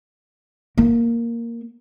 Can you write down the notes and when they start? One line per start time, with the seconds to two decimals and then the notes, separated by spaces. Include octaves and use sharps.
0.78 A#3